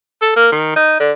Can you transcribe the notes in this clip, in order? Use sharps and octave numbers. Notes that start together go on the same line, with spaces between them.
A4
A#3
D#3
D#4
D3